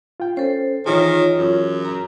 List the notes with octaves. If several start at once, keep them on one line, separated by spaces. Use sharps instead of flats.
F4 G5
C#4 A4 C5
D#3 E3 E4 F4 G#4 C#5
F#2
A#5